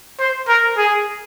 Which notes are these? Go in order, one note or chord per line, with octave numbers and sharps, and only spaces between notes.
C5
A#4
G#4